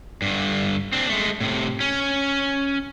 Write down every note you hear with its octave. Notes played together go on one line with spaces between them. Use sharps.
G2 D3
C4 D4
G#3 A3
A2 C3
C#4